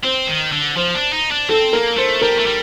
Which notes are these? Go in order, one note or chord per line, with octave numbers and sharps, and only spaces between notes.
C4 C5
D#3
D3
F3 C5
D4
D#4
D4
C4 A4
A#3 A#4
A3 C5
G3 A#4
A3
G3